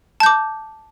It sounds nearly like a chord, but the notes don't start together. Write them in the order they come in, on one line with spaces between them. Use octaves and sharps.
A5 G6 D6